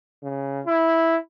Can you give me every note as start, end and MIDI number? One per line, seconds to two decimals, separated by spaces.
0.23 0.61 49
0.66 1.17 64